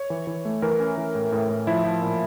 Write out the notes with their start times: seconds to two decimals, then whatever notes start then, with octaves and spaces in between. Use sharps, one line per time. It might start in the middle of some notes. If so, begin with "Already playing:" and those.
Already playing: C#5
0.10 E3
0.27 E3
0.45 A3
0.62 E3 A#4
0.80 C#4
0.97 E3
1.15 A2
1.32 A2
1.50 A2
1.67 F3 E4
1.84 F3
2.02 A#2